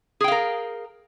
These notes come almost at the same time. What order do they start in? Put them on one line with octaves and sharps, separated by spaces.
G#4 G5 F5 A#4